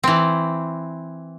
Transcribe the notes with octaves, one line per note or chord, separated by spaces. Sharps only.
E3 C4